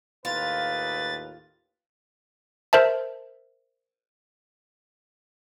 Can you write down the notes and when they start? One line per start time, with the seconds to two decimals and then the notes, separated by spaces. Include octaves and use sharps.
0.25 D#2 A2 F4 B4 A6
2.73 A#4 C5 E5 A5